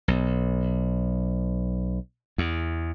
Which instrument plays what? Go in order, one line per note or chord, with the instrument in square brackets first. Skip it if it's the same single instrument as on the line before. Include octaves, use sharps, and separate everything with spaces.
[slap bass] B1
E2